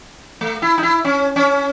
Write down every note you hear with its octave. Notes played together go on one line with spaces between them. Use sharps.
A3
E4
D#4
E4
C#4
C#4